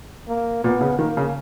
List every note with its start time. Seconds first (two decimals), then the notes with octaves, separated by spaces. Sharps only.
0.28 A#3
0.64 A#2 B3
0.81 C#3
0.99 D#3 A#3
1.17 C#3